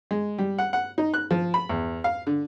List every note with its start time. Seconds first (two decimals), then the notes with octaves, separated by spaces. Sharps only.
0.11 G#3
0.39 G3
0.59 F#5
0.73 F#5
0.98 D#4
1.14 F#6
1.31 F3
1.54 B5
1.70 E2
2.04 F5
2.27 D3